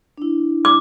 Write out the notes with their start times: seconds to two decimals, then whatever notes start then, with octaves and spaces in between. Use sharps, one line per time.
0.18 D4 E4
0.65 D6